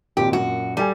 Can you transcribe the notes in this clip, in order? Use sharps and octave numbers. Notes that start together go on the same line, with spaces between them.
G#1 F2 A#2 G4
F#2 A#2 F#4
G3 A4 G5 G#5